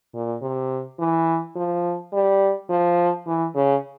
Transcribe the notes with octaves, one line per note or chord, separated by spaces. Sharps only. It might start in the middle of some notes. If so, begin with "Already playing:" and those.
A#2
C3
E3
F3
G3
F3
E3
C#3